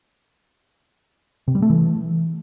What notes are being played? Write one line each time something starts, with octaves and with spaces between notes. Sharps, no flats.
C3
G3
A3
E3